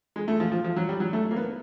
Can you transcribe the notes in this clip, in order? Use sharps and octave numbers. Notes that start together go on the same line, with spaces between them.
G#3
A3
F3
F3
F3
F#3
G3
F#3
A3
A#3
B3